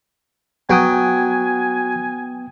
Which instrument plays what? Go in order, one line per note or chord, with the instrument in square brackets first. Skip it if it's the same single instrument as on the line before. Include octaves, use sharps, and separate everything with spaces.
[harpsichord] F#3 [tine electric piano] B3 G5 D#6 [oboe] G#5